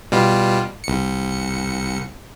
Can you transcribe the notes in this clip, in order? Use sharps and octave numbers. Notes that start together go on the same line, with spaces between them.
B2 G3 F4
C2 C#7